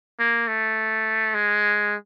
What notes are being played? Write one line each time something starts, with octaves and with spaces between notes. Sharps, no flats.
A#3
A3
G#3